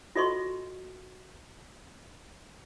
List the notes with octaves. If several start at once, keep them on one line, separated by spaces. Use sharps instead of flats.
F4 F#4 A4 D#5 C6 C#6